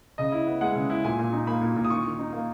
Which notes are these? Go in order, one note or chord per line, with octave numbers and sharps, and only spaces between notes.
C#3 D#5
E4
B3
G#3 F#5
C#3
E4
A#2 G#5
A#2
D#4
A#3 B5
A#2
A#2
D#6
D#3 C#6
D#3
D#4
A#3